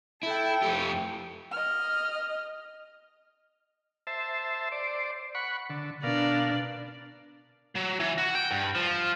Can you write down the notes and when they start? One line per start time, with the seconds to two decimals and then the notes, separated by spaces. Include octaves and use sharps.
0.23 E4 A4 G5
0.62 F2 A3 G4
1.52 D#5 F6
4.07 C5 E5 A5
4.72 C5 D5
5.35 F#5 B5 C#6
5.70 D3
6.03 B2 D4 A#4 D5 F5
7.76 F#3
8.00 E3
8.18 F#4
8.35 G5
8.51 G2
8.75 F3